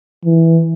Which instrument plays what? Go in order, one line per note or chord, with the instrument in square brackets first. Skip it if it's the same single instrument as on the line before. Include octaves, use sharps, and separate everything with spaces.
[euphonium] E3